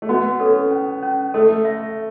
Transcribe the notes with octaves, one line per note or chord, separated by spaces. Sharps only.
A3
B3 F#4
C#4 A4
C#4
C#4
A3 A4
E5